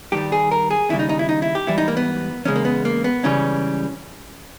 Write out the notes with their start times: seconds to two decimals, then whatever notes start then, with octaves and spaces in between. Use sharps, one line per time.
0.12 G2 D#3 G3 G4
0.32 G#4
0.51 A#4
0.71 G#4
0.90 D#2 C#3 G3 E4
0.99 D#4
1.09 D#4
1.19 E4
1.29 D#4
1.42 E4
1.55 G4
1.67 G#2 E3 G3 E4
1.78 D#4
1.88 A#3
1.97 B3
2.45 E2 C#3 G#3 C#4
2.56 A#3
2.65 B3
2.85 A#3
3.04 B3
3.23 C#2 C#3 E3 G3 C#4